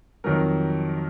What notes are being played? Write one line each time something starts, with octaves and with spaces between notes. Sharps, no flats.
F2 D#3 F#3 A#4